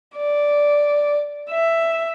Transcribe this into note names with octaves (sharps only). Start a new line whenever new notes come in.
D5
E5